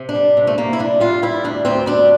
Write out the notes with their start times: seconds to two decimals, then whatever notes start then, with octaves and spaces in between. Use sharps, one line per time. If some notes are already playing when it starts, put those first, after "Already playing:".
Already playing: C3
0.09 D4
0.15 G3
0.37 C3
0.47 A3
0.58 C3 A#3
0.73 E4
0.79 G3 D4
1.00 G3 F4
1.22 G3 E4
1.44 D2 D4
1.65 D2 C4
1.86 G3 D4